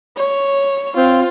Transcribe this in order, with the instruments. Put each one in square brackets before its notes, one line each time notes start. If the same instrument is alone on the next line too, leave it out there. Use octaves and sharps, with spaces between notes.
[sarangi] C#5
[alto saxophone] C4 [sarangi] F4